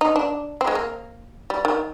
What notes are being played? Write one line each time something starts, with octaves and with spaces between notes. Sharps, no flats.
D#4
D4
C4
G#3
A#3
G3
D#3